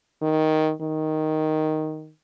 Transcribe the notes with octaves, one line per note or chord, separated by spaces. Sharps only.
D#3
D#3